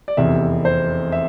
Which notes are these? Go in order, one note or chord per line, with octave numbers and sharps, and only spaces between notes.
D5
F1 E2 C3 E5
C5
E5